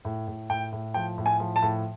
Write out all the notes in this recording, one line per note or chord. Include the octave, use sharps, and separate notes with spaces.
A2
A2
A2 G5
A2
F3 G5
A2
G#5
F3
A5
A2